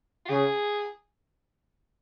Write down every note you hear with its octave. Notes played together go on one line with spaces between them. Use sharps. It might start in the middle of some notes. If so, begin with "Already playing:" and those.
F4
C#3 G#4